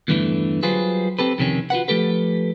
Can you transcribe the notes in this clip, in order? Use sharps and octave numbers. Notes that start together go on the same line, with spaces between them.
E2 G2 D3 E3 A3
F#3 G3 F4 G#4 B4 C5
C4 G4 A4 B4
F2 C3 D#3 C#4
F4 F#4 B4 F#5
F3 A3 G4 A4 B4